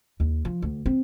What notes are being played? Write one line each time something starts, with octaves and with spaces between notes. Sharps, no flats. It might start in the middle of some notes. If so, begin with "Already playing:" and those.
D#2
F3
D2
C4